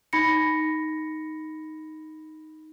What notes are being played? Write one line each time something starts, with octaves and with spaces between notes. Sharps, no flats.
D#4 B5 A#6 C#7